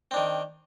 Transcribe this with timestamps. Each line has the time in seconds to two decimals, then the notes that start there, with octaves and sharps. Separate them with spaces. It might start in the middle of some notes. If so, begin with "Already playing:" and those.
0.11 C4
0.14 D4
0.16 D#3